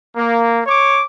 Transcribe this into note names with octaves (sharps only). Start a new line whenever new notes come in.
A#3
C#5 D6